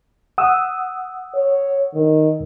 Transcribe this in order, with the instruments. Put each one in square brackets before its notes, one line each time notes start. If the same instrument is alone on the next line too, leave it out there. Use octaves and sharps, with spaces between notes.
[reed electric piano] F#5 D#6 E6
[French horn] C#5
D#3